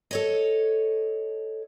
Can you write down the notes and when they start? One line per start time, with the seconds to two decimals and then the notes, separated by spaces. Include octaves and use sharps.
0.11 A4 C#5 D#5